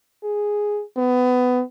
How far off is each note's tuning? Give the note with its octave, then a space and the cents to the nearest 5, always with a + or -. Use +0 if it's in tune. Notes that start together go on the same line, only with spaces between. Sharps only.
G#4 +0
B3 +20